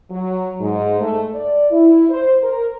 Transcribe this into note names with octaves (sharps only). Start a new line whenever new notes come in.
F#3
G#2
A3
D5
E4
C5
A#4